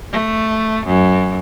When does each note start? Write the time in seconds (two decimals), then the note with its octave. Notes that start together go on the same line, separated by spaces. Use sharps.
0.12 A3
0.87 F#2